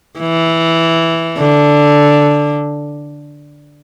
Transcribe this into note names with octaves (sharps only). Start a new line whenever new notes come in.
E3
D3